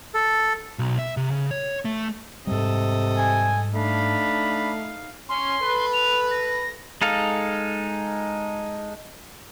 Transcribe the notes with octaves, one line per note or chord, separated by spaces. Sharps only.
A4
B1
E5
C3
C#3
C#5
A3
G#2 C3 G3 A4 D#5
G#5
A3 D4 D#4 F5 B5
C#4 C6
A4 B4
F7
A#6
G#3 D#4 A4 F5